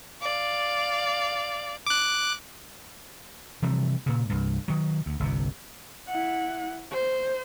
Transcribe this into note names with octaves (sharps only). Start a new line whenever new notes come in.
D5 F5
D6 F#6
C3 E3 F3 G3
A#2 C#3
C2 G2
D#3 F#3
D2
G1 C2 C3
E4 F#5
C5